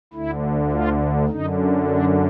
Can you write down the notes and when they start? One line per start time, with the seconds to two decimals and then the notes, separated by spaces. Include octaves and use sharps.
0.13 D2 D3 E4
0.72 F4
1.29 F#2 D3 D#4
1.88 D4